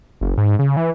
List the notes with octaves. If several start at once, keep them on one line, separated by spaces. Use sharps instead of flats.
F#1
G#2
C#3
E3